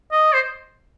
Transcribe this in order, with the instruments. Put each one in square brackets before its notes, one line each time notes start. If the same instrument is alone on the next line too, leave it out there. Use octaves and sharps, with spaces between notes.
[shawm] D#5
C5